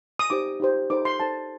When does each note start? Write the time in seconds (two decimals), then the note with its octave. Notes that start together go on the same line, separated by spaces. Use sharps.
0.19 D#6
0.30 D#4 G4 C5 D6
0.60 D#4 G4 C5
0.90 D#4 A4 C5 D6
1.05 C6
1.20 D#4 A4 C5 A5